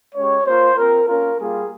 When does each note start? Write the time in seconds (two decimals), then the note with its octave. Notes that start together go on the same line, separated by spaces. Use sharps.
0.15 G#3 C#4 G4 C#5
0.46 A#3 F4 C5
0.77 C4 F4 A#4
1.07 A#3 C#4 F4 A#4
1.39 G3 A#3 F4 G#4